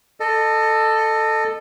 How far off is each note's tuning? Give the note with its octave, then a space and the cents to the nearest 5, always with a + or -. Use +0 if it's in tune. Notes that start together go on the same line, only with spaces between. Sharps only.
A4 +5 D#5 -20